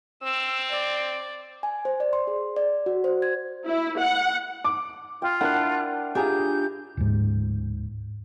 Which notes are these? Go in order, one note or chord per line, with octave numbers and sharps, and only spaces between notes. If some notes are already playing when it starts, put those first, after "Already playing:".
C4 E6
D5
G#5
C5
D5
C6
G#4
D5
F#4
C5
G#6
E4
F#5
D6
F4 G5
D4 E4 A#4 D5 F#5 A5 F#6
D4 F4 G4 G#4 G#5 A#5 G6
D1 G#2